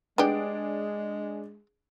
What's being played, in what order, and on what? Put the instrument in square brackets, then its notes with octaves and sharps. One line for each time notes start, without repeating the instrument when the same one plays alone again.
[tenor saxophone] G#3 [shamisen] B3 G4 [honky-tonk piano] D4 G#4 D7